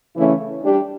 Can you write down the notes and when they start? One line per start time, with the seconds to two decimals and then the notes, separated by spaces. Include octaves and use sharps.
0.17 C#3 E3 A3 C#4 E4
0.64 G3 D4 G4